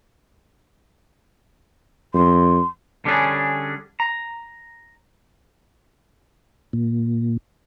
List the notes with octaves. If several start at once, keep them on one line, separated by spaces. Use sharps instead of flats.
F2 C6
D3 G3 B3 C#4 D4 G#4
A#5
A#2